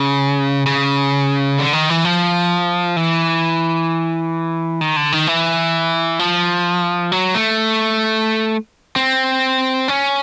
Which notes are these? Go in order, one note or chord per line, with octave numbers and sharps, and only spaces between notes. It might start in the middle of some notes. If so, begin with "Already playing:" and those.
Already playing: C#3
C#3
D3
D#3
E3
F3
E3
D#3
D3
D#3
E3
F3
F#3
A3
C4
C#4